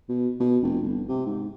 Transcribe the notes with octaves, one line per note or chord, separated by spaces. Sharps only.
B2
B2
F1
G1
C3
G#2